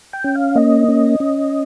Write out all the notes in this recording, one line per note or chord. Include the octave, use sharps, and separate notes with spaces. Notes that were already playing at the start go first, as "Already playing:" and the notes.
G5
C#4
F5
A#3 D#5
C#4
C#4